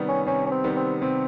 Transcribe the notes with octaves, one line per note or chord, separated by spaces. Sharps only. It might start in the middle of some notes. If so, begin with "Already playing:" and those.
Already playing: C3 D#3 G3 B3
C#4
C3 C#4
C#4
C4
D#3 G3 B3
C4
C3 C4